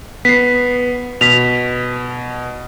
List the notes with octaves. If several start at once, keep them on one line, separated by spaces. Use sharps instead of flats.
B3 B6 C7
B2 B6 F7